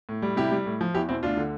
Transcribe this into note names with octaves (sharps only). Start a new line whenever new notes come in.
A2
G3
C3 E4 G4
G3
A2
F3
E2 E4 G4
B2 C4 E4
D2 D4 F4
D3